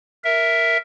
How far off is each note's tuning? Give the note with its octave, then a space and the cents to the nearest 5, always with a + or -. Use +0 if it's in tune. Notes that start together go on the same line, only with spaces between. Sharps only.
A#4 +0 E5 +0